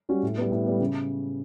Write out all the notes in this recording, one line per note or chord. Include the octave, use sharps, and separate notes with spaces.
G3 C#4 F#4
A2
G3 B3
A2
G3 B3
C#3